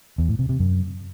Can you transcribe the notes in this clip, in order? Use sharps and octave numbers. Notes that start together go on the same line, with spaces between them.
E2
A2
C3
C3
F#2